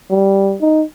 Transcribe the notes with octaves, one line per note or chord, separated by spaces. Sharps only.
G3
D#4